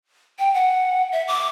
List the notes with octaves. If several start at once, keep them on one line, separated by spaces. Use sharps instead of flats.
G5
F#5
E5
D6